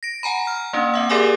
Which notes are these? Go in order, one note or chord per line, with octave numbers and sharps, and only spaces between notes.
A#6 D7
F#5 G#5 A#5 B5
F6
A#3 C#4 D4
C4 E5 F#5
G4 G#4 A#4 D5 G#5 D6